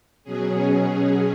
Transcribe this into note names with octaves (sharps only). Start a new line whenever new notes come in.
B2 F#3 C#4 G#4